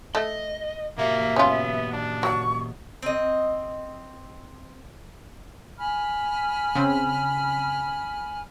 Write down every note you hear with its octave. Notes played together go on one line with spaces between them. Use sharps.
A3 D#5
A#2 A#3 F#4 G4 E5
B3 C#4 F4
D4
F#3 F#5 C#6
C4 D#5
G#5 B5 F6
C#3 C4